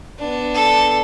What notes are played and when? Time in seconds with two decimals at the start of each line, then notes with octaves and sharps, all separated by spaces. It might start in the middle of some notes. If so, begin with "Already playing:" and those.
0.19 B3 D4
0.55 A4